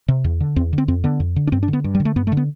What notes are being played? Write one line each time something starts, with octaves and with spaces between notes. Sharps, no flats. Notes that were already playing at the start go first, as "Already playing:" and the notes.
C3
E2
D3
E2 C4
D3
C4
F2 C4
D3 B3
F2
D3
D4
G2 C4
D4
D3
B3
G2
G3
D3
A3
G2 B3
A3
D3
B3